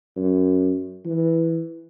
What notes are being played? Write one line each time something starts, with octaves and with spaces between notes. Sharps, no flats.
F#2
E3